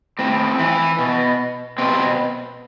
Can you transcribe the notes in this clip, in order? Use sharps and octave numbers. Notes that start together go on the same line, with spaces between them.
A2 C4
E3
B2
B2 C4